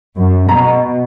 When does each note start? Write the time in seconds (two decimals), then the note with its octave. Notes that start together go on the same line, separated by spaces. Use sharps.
0.17 F#2
0.48 B2 A#5